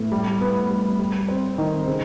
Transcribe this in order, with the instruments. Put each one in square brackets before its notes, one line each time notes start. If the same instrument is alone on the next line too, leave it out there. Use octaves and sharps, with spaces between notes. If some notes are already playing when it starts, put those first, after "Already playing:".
Already playing: [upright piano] A2 B3
G3
B3
G3
G3
C4
D#3
C#3